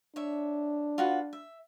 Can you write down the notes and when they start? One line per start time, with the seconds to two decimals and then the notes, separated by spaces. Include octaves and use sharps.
0.16 D4 C#5 E5
0.98 F4 F#4 B4
1.33 E5